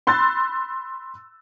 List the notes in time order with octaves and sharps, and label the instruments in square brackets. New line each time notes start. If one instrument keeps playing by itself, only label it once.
[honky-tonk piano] B5 C6 E6 F#6 A6